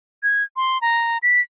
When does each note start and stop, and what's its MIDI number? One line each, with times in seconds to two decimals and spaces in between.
0.23 0.43 92
0.56 0.81 84
0.81 1.18 82
1.23 1.40 95